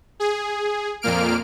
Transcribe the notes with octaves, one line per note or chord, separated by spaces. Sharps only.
G#4
F2 A#2 A#3 F6 D7